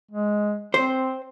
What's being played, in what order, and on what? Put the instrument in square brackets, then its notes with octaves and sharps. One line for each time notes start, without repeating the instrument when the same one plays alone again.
[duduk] G#3
[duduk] C4 [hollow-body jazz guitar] C5